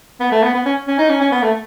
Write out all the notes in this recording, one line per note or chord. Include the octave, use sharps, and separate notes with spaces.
B3
A3
B3
B3
C#4
C#4
D#4
C#4
C#4
B3
A3